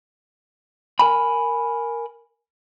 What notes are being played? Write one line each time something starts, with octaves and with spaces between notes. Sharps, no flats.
A#4 G#5 B5